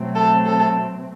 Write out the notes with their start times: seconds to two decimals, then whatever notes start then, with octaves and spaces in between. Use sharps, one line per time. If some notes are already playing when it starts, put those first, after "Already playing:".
Already playing: B2 F#3 A3 C4
0.16 A4
0.46 A4